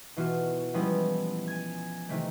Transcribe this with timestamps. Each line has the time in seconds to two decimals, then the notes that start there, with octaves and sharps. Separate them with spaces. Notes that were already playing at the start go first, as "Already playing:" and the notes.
0.17 B2 E3 F4 F#4
0.74 F3 G3 G#3 B3 C#4 E4
1.48 G#5 G#6
2.09 C3 D#3 E3 A3